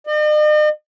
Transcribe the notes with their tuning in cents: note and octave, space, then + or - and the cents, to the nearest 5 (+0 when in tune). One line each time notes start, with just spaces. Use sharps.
D#5 -45